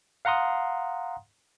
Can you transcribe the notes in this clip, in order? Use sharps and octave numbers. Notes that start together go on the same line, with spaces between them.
F5 F#5 A#5 C6 D#6